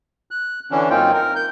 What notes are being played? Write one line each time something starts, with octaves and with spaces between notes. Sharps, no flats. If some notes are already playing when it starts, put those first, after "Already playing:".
F#6
D3 E3 C#4 D4
F#2 A#3 C4 D#4 F4 G5
A#4
G6